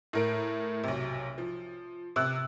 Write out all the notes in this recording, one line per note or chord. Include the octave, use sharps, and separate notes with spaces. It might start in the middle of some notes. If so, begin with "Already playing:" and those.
A2 A#4 D7
B1 C3
F3
C3 E6 F#6